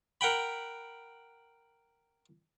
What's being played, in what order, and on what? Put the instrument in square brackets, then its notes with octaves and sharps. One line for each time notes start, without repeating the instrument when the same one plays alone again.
[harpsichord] A#4 F#5 G5 B5